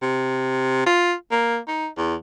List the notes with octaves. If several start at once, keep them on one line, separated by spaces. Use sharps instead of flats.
C3
F4
A#3
D#4
E2